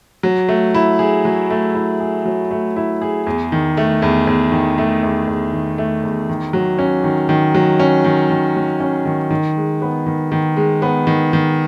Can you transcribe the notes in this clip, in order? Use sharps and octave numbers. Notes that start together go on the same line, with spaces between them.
F#3
A3
E4
G#4
F#3
A3
E4
G#4
F#3
A3
E4
G#4
E2
D#3
A3
E2
E2
D#3
A3
E2
E2
D#3
A3
E2
D#3
F#3
C#4
D#3
D#3
F#3
C#4
D#3
D#3
F#3
C#4
D#3
D#3
G#3
B3
D#3
D#3
G#3
B3
D#3
D#3